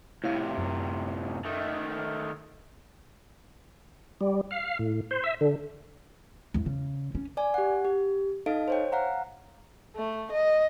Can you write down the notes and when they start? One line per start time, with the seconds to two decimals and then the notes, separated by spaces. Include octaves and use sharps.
0.24 A2 C3 E4 F5
0.58 F#2
1.45 D#3 A3
4.21 G3
4.51 F5
4.79 A2
5.11 C5
5.24 E5
5.41 D3
6.54 E2 G2
6.66 C#3
7.15 C#4
7.37 D5 G#5
7.54 G4 F#5
7.85 G4
8.46 D#4 A4 D#5 F5 D7
8.68 C5 C#5 G5
8.92 F5 F#5 A#5
9.96 A3
10.32 D#5